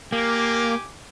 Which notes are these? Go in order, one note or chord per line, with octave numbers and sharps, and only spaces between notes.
A#3 G4 G#5 D6